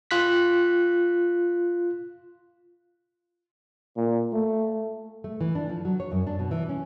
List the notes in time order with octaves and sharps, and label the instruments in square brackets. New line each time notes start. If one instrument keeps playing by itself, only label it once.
[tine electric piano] F4 F#6 B6
[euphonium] A#2
A3
[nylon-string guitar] A3
E3
D4
F3
F#3
C#5
F#2
D4
B2
E3
C#4